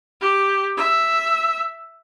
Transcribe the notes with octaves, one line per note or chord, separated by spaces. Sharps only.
G4
E5